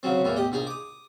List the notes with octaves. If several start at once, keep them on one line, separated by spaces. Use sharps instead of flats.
C#3 F#3 C4
E2 A2 A#3
G4 D#5
A#1 D#4 G#4
D6 D#6